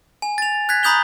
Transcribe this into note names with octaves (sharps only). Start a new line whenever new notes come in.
G#5
A6 F7
F#6 G#6 B6
A#5 B5 D#6 G6 F7 G7